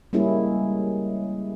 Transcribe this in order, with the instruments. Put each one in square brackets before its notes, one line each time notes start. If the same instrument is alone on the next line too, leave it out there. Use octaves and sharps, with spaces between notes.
[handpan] G3 G#3 A#3 C#4 E4 G#4